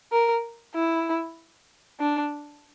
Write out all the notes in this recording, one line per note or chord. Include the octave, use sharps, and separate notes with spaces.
A#4
E4
D4